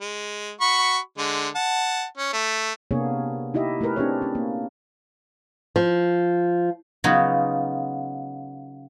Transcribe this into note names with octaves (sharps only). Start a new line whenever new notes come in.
G#3
F#4 B5 C#6
D3 G#3
F#5 A5
C#4
A3
C3 A#3 B3 D4 G#4 C#5
D#4 E4 G4 D#5 E5
A3 E4 G#4 A#4 B4
C4 D4 E4 G4 G#4 C#5
C#4
A#3
F3
C#3 F#3 B3 D#4 F4 F#4